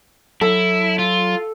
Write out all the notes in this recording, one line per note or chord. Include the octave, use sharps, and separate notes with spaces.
F#3 E4 A4
F4